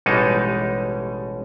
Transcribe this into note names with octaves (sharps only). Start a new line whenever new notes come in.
A1 B2 G3 G#3 D#4